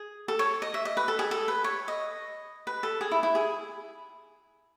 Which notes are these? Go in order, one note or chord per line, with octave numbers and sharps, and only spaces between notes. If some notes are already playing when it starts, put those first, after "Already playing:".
Already playing: G#4
A4
C#5
D#5
E5
D#5
B4
A4
G#4
A4
B4
C#5
D#5
B4
A4
G#4
E4
E4
G#4